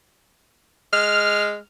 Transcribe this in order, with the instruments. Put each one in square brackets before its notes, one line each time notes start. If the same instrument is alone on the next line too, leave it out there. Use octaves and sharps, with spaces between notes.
[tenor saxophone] G#3 [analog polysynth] F6